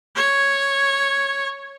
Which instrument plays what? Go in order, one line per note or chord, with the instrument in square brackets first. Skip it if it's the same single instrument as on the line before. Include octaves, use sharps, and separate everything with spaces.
[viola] C#5